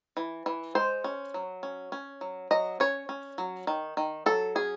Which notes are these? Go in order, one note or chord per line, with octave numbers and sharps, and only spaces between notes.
E3
E3
G#3 C5
C#4
F#3
C#4
C#4
F#3
F#3 D#5
C#4 C#5
C#4
F#3
D#3
D#3
F#3 A4
C#4 G#4